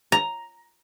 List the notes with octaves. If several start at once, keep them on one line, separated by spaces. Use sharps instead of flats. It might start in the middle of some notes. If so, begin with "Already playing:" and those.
A#5